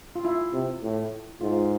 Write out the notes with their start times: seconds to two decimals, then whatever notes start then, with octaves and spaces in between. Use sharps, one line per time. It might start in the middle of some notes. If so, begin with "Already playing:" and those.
0.16 F4
0.25 E4
0.53 C3
0.83 A2
1.41 G#2 F4